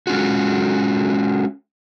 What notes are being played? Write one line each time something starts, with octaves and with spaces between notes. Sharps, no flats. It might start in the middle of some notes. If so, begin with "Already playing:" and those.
G#3 C#4 F4 F#4